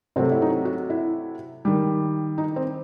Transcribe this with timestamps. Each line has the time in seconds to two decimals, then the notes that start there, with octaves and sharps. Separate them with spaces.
0.16 C3 F#3 A3 C4
0.32 E4
0.42 D#4
0.65 F#4
0.90 E4
1.65 D#3 G3
2.38 D#4
2.56 C4